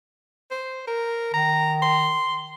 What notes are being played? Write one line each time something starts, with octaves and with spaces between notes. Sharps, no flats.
C5
A#4
D#3 A#5
C6